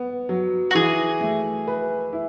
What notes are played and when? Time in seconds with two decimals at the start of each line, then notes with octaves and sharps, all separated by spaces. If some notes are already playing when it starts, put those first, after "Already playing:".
Already playing: B3
0.29 F#3
0.71 F#4
0.75 E3 G#4
1.21 A3
1.67 B4
2.13 E4